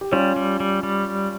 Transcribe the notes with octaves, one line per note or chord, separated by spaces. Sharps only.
G4
G3 C#4 F4
G3
G3
G3